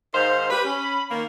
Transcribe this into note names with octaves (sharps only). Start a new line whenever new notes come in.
G#2 D#3 C5 F5
G4 B4 B5
C#4
D#3 A#3